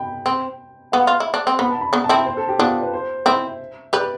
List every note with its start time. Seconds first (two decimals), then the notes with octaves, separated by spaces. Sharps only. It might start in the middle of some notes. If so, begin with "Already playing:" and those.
Already playing: G5 B5
0.26 C4
0.92 B3 F5
1.07 F4
1.20 E4
1.34 D4
1.47 C4
1.59 B3 B5
1.70 A5
1.81 B5
1.93 B3 D4
2.04 A5
2.09 C4 E4
2.15 G5
2.26 C5
2.37 A4
2.49 G4
2.59 B3 D4 F4
2.82 B4
2.93 C5
3.26 C4 E4 E5
3.93 G4 B4 D5